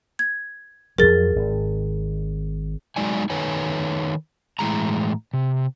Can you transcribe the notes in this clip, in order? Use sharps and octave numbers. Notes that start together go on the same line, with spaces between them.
G#6
F2 F3 F#3 G#4 A#4 A6
G#1
F#3 G#3 D#4 D5 G#5
D#3 D#4 A4 B4 C#5 G#5
A2 E3 G#3 A#5
C3